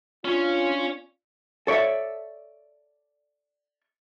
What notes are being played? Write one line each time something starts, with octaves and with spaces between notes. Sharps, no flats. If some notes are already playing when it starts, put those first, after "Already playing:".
C#4 D4 F4 C#5
A4 C#5 D5 E5